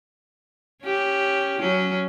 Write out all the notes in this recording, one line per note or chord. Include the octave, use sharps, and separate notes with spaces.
C#4 G4
F#3 C#4